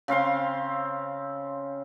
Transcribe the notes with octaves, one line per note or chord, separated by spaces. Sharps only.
C#3 C4 F5 C6